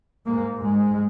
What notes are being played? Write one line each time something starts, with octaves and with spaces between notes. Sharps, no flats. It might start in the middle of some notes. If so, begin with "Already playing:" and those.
G#2 A#3
G#2 G#3